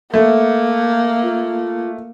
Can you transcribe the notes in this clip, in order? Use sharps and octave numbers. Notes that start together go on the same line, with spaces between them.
A3 A#3
F4